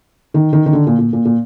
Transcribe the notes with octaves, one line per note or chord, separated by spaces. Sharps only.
D#3
D#3
D#3
D3
A#2
A#2
A#2
A#2